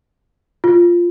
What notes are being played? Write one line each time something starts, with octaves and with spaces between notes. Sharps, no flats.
F4